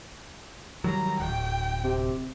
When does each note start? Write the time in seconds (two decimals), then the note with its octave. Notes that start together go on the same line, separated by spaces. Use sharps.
0.84 D#3 F#3 G3 A#5
1.20 D1 G5
1.84 C3